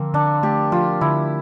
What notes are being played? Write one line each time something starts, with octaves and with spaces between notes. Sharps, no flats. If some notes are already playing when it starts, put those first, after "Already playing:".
Already playing: D3 F3 A#3 C4
D3 D4
A3 G4
F3 F4
D3 E4